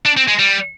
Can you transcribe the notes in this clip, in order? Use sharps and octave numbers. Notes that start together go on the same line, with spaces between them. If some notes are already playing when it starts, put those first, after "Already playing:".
D4
C4
G#3
G3